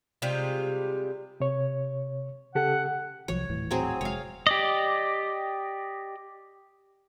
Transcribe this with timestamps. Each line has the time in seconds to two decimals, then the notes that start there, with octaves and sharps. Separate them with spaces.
0.22 C3 G3 G#3 F4
1.40 C3 C#5
2.55 C#3 G4 A4 F#5
3.28 C2 F3 F#3 C#5
3.49 D#1 A2 E3
3.71 F#3 C4 G#4
4.01 F1 G#3 C#5 F5
4.47 G4 D5 D#5